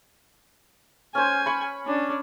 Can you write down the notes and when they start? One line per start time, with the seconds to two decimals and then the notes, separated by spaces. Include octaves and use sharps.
1.15 C#4 C5 G#5
1.46 B5 C#6
1.85 C#4 D4